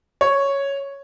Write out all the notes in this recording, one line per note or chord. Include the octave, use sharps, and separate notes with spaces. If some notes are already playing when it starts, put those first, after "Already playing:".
C#5